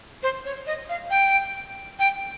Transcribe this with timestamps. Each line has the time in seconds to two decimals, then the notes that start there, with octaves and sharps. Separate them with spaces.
0.23 C5
0.45 C#5
0.67 D#5
0.89 F5
1.10 G5
1.99 G5